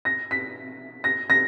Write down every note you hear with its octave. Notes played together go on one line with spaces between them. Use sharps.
A#6
B6
A#6
A#6